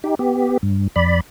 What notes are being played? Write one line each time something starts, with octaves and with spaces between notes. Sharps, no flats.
D#4 G4
B3 G4
G2
F2 D5 B5